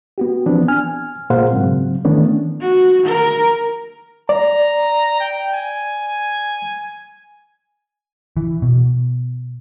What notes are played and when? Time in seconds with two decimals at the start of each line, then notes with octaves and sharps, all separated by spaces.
0.18 B3 F#4 G4
0.46 E3 F3 B3 C4 D4
0.68 G#5 F6
1.30 A#2 G#4 A#4 C5 F5 F#5
1.51 G#2 C#3 F#3 C4
2.05 D#3 E3 A3 B3 C#4 D4
2.61 F#4
3.06 A#4
4.29 D5 A#5
5.20 G5
5.54 G#5
8.37 E3
8.62 B2